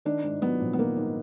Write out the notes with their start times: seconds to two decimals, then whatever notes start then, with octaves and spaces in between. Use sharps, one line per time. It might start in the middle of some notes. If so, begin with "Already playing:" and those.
0.05 D#3 D4
0.24 G#2
0.42 F#3 B3
0.61 A#1
0.73 B3
0.78 D#3 A#3
0.97 G#2